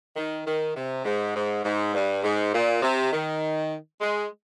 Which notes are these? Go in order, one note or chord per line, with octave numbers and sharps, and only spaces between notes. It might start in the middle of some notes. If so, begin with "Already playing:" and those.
D#3
D#3
C3
G#2
G#2
G#2
G2
G#2
A#2
C3
D#3
G#3